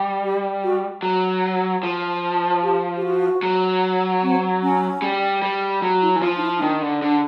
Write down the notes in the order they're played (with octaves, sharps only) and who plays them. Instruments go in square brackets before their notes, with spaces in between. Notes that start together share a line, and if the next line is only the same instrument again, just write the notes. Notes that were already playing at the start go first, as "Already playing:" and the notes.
Already playing: [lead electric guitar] G3
[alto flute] G4
F#4
[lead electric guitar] F#3
F3
[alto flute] G4
G4
F#4
[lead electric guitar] F#3
[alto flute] C4
C#4
[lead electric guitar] G3
G3
F#3
[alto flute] E4
[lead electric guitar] E3
[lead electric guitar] F3 [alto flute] F4
[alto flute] D#4
E4
D#4
[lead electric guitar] D#3 [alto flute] D4
[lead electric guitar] D3
[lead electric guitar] D3 [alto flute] D4